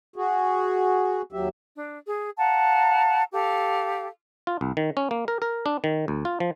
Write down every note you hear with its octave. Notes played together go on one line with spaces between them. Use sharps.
F#4 G#4
D#2 F#3 G4 E5
D4
G#4
F5 F#5 A5 A#5
G4 A4 F5
F4
C2
D#3
C#4
A#3
A#4
A#4
D4
D#3
D2
F4
F3